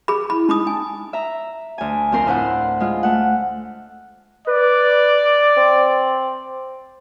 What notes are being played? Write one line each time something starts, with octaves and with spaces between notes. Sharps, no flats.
G#4 B5
E4 B5
G#3 D#4 B5 D#6
G#5 A5
E5 A#5
D2 G#5
F2 C4 A#4 C6
D2 A2 E4 C5 F#5 C6
G#3 F4
A3 F#5
B4 D5
C4